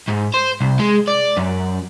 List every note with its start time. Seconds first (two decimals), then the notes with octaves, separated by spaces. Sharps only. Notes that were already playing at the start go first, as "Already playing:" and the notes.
0.08 G#2
0.34 C5
0.60 C2
0.79 G#3
1.08 D5
1.37 F#2